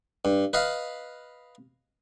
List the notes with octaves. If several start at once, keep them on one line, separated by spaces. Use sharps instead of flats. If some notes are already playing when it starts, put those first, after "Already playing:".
G2
B4 D#5 F5